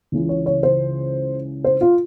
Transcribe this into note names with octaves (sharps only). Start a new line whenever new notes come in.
C#2 C#3 E3
C#5
C#5
C5
C5
F4